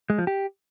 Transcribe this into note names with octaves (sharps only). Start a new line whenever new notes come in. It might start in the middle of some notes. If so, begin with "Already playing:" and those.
G#3
F3
G4